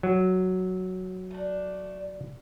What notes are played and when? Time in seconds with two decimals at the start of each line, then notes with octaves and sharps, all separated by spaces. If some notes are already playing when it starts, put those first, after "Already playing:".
0.03 F#3
1.31 A3 D4